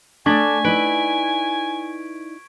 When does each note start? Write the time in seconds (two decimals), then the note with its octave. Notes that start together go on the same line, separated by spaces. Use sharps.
0.26 A3 D4 D5 G#5 C#6 G#6 B6
0.65 D#4 E4 B4 D5 D7